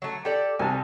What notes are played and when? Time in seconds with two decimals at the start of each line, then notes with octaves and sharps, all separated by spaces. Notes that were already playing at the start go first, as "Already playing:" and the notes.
0.02 F#3 A3
0.25 G4 A4 D5
0.59 C2 C3 G#5 A5